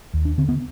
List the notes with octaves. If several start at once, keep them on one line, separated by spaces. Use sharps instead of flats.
D#2
D4
D3 C4
B3